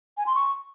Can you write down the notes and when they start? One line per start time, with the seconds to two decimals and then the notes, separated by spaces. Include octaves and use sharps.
0.18 G#5
0.26 C6
0.35 C#6